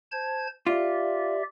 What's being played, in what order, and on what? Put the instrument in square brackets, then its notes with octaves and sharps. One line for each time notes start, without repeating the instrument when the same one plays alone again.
[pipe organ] C5 A5 G#6
[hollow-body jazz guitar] F4 [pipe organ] G4 D5 E5